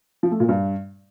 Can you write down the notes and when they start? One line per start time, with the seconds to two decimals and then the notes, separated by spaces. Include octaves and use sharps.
0.23 F3
0.31 A3
0.40 A#2
0.49 G2